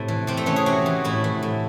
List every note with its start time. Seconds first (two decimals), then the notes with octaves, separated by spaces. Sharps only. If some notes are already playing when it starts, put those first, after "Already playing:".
Already playing: A2 C3 E4
0.08 E3
0.27 C3 C4
0.37 A3
0.46 E3 C#4
0.56 G#4
0.66 C3 F#4
0.86 E3
1.05 A2 E4
1.24 E3
1.43 A2